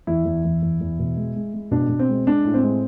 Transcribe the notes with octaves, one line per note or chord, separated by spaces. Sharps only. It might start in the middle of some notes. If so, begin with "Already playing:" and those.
E2 E4
E2
E2
E2
E2
B2
G#3
G#3
G#3
B2 D4
B2
C4
G#3
G#3 D4
A2
C4
G#3